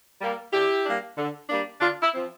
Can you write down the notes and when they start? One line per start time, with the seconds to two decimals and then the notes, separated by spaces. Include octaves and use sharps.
0.21 G3 A#3
0.53 D3 E4 G4
0.86 G3 A#3 D4
1.17 D3
1.50 G3 A#3 D4
1.81 D3 D4 F4
2.02 E4
2.13 F3 C4